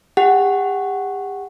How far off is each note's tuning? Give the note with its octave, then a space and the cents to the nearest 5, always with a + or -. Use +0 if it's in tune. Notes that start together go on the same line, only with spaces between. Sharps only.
G4 +40 F#5 +10